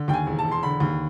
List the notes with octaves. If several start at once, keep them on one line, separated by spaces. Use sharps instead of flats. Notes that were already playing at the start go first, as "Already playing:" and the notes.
Already playing: D3
D#2 G5
G#5
E1
A5
E1
C6
D3 B5
D#2